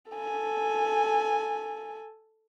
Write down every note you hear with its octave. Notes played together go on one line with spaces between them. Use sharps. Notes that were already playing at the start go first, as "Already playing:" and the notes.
A4 G#5